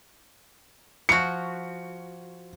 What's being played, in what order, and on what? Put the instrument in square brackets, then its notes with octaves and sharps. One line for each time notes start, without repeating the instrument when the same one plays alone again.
[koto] F3 F#4 [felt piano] C#7